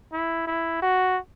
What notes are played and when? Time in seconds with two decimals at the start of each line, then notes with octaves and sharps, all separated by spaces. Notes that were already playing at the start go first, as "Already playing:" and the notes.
0.13 E4
0.47 E4
0.82 F#4